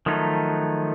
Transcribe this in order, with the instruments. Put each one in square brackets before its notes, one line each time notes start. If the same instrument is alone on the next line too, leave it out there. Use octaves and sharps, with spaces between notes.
[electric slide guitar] D#3 F3 F#3 A3 D#4